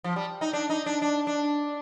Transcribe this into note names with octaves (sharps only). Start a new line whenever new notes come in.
F3
G3
D#4
D4
D#4
D4
D4
D4